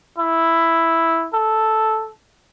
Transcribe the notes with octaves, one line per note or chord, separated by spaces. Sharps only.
E4
A4